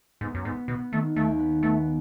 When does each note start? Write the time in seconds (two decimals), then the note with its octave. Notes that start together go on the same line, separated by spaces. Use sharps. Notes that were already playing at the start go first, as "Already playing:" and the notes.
0.21 G#2 B3
0.35 F#2
0.45 G#2 B3
0.68 B2 B3
0.92 D#3 A3
1.16 D#2 A3
1.39 B3
1.63 A3 B3